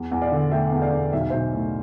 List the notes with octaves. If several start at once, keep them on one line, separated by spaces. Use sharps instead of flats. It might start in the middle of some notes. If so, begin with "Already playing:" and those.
Already playing: E2
E2
D5 F5
D3
A3 E5 G5
E2
D5 F5
E2
B1 E5
F5
B1 C5 E5
A2